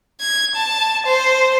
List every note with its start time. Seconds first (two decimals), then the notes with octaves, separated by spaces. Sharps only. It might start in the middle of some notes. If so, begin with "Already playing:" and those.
0.21 G#6
0.56 A5
1.06 C5